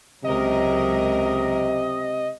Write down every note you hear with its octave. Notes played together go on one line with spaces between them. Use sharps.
C#2 C3 F#3 A#4 D#5